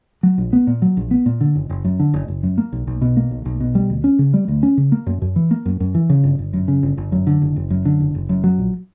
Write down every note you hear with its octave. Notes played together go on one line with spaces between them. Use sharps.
F#3
A#1
B3
A#2
F#3
A#1
B3
A#2
D3
F#1
F#1
F#2
D3
F#1
F#1
F#2
A#3
B1
B1
B2
A#3
B1
B1
B2
G3
D2
C#4
C#3
G3
D2
C#4
C#3
A#3
F#2
F#2
E3
A#3
F#2
F#2
E3
C#3
G1
G1
F#2
C#3
G1
G1
F#2
D3
F#1
F#1
F#2
D3
F#1
F#1
F#2
F#3
A#1